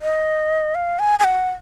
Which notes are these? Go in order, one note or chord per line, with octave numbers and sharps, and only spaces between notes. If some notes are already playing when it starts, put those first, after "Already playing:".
D#5
F5
G#5
G#5
F#5